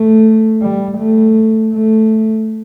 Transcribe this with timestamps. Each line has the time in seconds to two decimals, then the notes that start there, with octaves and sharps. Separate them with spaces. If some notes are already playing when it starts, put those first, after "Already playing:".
Already playing: A3
0.61 G3
0.98 A3
1.73 A3